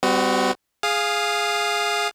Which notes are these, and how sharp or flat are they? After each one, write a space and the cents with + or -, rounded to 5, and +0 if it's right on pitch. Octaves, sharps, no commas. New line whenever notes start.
G3 +0 C4 -45 F#4 +0
G#4 +0 F5 +0 D#6 -20